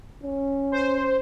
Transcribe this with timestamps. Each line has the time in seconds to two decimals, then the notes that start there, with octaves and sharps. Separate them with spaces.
0.23 C#4
0.72 C5